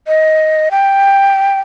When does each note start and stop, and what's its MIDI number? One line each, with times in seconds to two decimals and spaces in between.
0.07 0.69 75
0.71 1.60 79